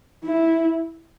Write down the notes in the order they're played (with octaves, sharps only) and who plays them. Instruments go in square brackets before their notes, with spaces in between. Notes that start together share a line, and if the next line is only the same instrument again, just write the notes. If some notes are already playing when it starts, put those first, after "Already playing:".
[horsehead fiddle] E4